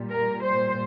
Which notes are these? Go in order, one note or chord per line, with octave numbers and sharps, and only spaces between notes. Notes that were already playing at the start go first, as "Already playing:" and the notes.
Already playing: A#2 G3
A#4
C5